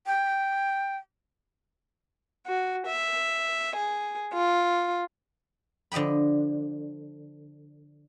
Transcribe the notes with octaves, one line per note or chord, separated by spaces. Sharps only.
G5
F#4
E5
G#4
F4
D3 F3 D#5 G5 B5